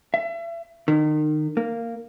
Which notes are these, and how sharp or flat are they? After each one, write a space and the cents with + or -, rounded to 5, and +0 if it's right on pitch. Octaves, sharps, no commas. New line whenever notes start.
E5 +35
D#3 -30
A#3 -10